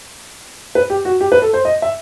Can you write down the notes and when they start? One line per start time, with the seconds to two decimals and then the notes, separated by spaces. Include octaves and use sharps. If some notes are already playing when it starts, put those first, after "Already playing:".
0.75 B4
0.90 G4
1.05 F#4
1.21 G4
1.32 B4
1.42 A4
1.54 C5
1.65 D#5
1.82 E5